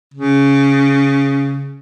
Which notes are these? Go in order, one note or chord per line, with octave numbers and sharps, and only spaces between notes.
C#3